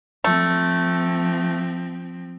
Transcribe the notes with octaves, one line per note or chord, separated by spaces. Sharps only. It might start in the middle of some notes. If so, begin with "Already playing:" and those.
F3 A3 C4